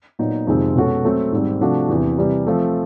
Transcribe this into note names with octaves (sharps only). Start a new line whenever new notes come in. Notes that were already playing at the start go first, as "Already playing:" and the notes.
A#2 F#3 B3 D#4
F2 C3 D#3 G#3 C4
B2 G#3 C#4 F#4 A4
F#3 A3 C4
G#2 D#3 G3 C4
C3 F3 A3 D4 F#4
E2 C3 E3
C3 E3 G3
F3 A3 C4